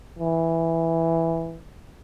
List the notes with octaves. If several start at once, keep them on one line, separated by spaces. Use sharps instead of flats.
E3